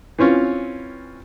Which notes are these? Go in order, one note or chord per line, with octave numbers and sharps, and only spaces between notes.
E3 C4 C#4 F4